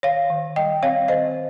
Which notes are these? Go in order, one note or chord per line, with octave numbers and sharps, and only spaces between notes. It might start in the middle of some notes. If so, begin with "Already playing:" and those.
D#3 C#5 F5
D#3
G3 D#5 G5
C4 C#5 F5
D#3 C5 D#5